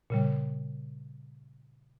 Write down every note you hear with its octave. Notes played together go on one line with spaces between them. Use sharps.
A#2 C#3 G3